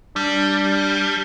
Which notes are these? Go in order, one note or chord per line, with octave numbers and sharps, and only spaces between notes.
G3 D4